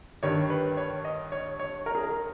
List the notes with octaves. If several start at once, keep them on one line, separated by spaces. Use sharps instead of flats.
G2 D#3 G3 C#5
B4
C#5
D#5
C#5
C#5
A#4
G#4
A#4